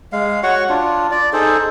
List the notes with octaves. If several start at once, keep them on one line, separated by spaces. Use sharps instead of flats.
G#3 F5
F#4 C#5 F#5 C#6
D4 F4
D5
D#4 G#4 A4 C5